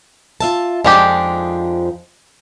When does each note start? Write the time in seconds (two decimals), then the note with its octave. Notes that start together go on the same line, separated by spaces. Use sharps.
0.40 F4 E5 A5
0.84 F2 F3 G#3 D4 D#4 G4